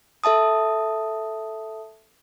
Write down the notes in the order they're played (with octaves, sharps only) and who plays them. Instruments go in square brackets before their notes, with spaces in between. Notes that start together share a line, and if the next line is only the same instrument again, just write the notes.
[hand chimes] A4 E5 A5 D#6